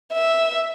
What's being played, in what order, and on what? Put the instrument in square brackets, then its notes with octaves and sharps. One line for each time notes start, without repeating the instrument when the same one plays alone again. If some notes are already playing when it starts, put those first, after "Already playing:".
[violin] E5